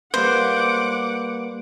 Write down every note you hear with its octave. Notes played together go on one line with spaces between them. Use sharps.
G3 A#3 B4 C5 F#5 D6